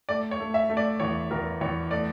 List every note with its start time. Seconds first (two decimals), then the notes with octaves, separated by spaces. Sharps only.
0.09 A3 D5
0.31 C#5
0.40 A3
0.54 E5
0.70 A3
0.77 D5
1.00 E2 C#5
1.31 E2 A#4
1.61 E2 C#5
1.91 A3 D5